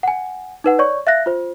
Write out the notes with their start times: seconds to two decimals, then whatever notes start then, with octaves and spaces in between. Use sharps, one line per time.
0.03 F#5 G#5
0.64 D#4 B4 F#5
0.79 C#5 D5 C#6
1.07 E5 F5 F#6 A#6
1.26 F4 C5